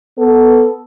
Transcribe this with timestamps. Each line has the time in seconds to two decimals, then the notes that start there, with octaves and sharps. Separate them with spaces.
0.18 B3 A4